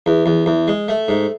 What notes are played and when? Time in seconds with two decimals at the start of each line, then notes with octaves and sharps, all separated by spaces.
0.06 E2
0.26 E2
0.46 E2
0.68 G#3
0.88 A3
1.08 G#2